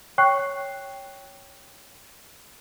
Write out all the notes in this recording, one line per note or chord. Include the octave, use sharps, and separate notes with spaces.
C#5 G5 C#6 F#6 C7